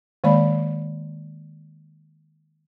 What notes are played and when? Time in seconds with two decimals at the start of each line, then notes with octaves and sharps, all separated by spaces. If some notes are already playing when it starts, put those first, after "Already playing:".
0.24 D#3 G#3 A#3 D5 B5